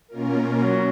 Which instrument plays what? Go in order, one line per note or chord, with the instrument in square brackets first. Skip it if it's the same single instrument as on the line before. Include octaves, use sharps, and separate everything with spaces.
[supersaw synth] B2 A#3 C#4 F4 A#4
[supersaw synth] B2 [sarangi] F#3